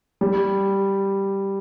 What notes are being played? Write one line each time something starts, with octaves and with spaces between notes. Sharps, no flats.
G3